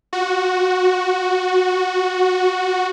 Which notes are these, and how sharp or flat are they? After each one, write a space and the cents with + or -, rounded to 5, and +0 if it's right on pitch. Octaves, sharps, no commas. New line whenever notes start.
F#4 -10